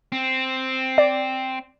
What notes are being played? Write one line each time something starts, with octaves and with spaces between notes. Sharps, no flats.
C4
D5